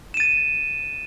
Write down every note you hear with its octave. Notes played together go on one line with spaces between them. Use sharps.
A6 D#7 E7